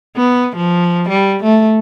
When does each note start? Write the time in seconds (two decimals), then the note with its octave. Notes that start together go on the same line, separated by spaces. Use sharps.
0.16 B3
0.55 F3
1.09 G3
1.43 A3